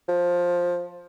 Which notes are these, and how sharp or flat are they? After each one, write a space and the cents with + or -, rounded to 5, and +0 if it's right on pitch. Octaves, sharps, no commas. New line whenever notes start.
F3 +10